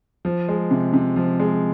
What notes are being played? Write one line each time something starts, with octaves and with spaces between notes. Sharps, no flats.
F3
G#3
C3
C3
F3
G#3